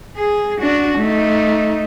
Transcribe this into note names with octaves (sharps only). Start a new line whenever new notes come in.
G#4
D4 F#4
A3 D#4